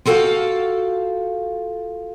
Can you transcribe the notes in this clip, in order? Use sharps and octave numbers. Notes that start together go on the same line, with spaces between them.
F4 F#4 A4 F5 G5